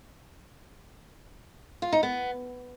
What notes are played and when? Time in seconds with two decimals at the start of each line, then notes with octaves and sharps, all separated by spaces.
1.82 F4
1.92 D#4
2.03 B3